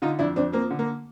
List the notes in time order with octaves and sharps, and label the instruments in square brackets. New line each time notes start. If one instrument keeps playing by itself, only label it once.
[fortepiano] D3 D#4 F4
F2 D4 E4
F2 C4 D4
F3 A#3 C4
D3
A#3